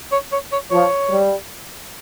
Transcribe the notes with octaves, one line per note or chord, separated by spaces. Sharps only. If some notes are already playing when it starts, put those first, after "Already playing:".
C#5
C#5
C#5
F3 C#5
G3